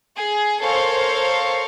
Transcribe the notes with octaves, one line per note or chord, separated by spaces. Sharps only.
G#4
A4 A#4 C5 C#5 F5